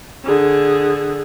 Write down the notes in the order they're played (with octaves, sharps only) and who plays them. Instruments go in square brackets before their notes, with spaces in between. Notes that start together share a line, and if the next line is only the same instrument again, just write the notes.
[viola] D3 G#4